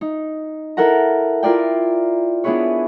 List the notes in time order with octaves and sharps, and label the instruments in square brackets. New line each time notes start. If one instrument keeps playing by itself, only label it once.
[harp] D#4
E4 A4 A#4 F#5 A#5
E4 F4 A#4 D5 G5
B3 D4 E4 G#4 B4 C#5